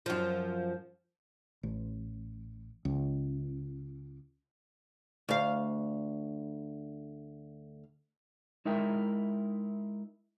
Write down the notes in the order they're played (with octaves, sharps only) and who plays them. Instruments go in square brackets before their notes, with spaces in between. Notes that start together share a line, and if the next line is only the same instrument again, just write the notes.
[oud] F#2 F3
[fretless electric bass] A1
C#2
[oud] D2 F5
[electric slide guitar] G#3 D#4 E4 A#4 E5 G5